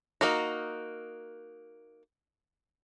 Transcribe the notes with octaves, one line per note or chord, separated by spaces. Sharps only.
A#3 D#4 F#4